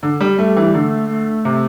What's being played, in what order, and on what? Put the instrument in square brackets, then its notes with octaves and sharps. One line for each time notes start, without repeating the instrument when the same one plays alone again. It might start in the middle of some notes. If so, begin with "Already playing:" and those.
[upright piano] D3
G3
[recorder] G3 [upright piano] A3
[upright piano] E3
[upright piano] D3 [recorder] A3
[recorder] A3
[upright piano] C3